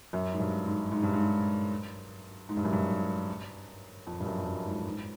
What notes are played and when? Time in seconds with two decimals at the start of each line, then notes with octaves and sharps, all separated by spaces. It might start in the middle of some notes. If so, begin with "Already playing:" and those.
0.13 F#2
0.33 G#2
0.40 G2
0.66 G#2
0.92 G#2
1.03 G2
1.13 G#2
2.49 G#2
2.57 G2
2.65 F#2
2.73 G2
4.07 F2
4.20 G2
4.26 F#2
4.39 F2
4.46 F#2
4.66 G#2
4.85 G#2